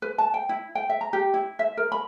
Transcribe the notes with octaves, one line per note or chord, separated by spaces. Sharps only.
B4
A5
G5
E4
G5
E5
A#5
G4
E4
E5
A#4
B5